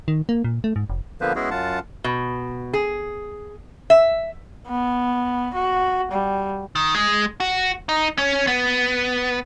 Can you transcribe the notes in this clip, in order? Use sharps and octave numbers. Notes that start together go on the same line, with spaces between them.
D#3
A#3
A#2
A3
G#2
F1
D3 F3 A#3 B3 B4 C5
G#3 B3 C#4 E4 F#4 G#4
F#2 F4 F#5 A5
B2
G#4
E5
B3
F#4
G3
D#3
G#3
F#4
D#4
C#4
B3